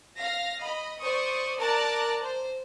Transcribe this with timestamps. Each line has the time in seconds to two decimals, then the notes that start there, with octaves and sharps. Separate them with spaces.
0.19 F5 A#6
0.63 D#5 B5
1.01 C5 D5 C#6 D#6
1.60 A#4 D5 A5 A#5 F#6
2.21 C5